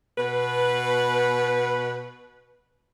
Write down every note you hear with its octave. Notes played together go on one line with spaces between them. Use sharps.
B2 B4